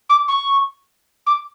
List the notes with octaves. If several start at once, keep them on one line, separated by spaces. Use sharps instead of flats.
D6
C#6
D6